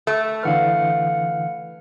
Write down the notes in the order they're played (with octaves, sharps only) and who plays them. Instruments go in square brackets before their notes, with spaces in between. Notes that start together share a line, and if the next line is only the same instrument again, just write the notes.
[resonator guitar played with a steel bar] A3
[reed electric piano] D3 E3 B4 [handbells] F5 F#5 F6